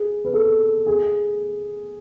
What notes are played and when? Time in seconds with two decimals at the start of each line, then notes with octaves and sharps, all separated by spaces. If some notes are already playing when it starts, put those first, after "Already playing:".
Already playing: G#4
0.25 B4
0.34 A4
0.86 G#4